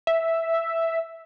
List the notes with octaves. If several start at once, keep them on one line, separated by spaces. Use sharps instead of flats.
E5